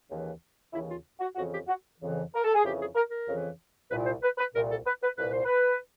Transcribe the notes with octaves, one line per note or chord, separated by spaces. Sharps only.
D#2 C#3 E3
D#2 C#3 E3 E4
F4
F#4
F2 C#3 E3 F#4
G4
F#4
F2 C#3 E3
A#4
A4
G#4
F2 C#3 E3 G4
G#4
A#4
A#4
F2 C#3 E3
C2 A#2 B4
C5
B4
B4
C2 A#2 A#4
A4
B4
B4
C2 A#2 B4
C5
B4